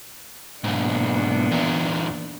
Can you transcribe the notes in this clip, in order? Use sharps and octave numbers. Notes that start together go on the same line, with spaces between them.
B1 G#2 A#3 B3 D4
E2 A#2